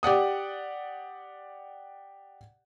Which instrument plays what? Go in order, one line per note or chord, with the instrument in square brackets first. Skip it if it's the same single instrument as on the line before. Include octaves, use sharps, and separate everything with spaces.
[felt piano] G4 D5 F#5 D#6